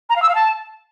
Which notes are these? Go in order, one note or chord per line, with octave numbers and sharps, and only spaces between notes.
A#5
F5
E6
F5
A5